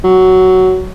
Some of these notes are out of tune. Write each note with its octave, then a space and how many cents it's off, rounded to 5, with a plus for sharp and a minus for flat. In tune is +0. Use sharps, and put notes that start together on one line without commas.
F#3 +10